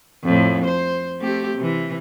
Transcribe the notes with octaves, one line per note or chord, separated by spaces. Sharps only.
F2 A2
C5
A3 C4 G4
C3 E3